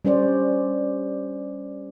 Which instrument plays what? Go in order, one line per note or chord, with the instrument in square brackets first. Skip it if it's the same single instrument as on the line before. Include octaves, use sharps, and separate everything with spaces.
[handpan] G3 C#4 C5 D5